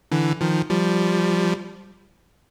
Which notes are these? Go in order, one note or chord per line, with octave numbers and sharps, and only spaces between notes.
D3 E3
D#3 F3
F3 G3